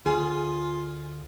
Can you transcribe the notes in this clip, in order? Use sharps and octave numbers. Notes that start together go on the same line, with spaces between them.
D2 F4 G#4